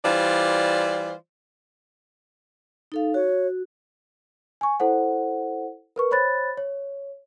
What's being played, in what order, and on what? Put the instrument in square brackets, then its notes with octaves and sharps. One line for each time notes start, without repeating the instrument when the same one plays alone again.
[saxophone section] E3 G3 F4 C5 D5
[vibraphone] D#4 A4 F5
[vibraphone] F#4 [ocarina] C#5
[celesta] G#5 C#6
E4 A4 C5 F#5
A#4 B4 C#6
C5 C#5 B5 F#6 A6
C#5